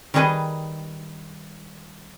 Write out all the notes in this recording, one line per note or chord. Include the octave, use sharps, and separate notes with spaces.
D#3 G3 D#4 G#4 B4 D#5